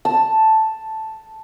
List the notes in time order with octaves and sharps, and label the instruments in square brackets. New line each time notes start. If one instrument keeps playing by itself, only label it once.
[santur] A5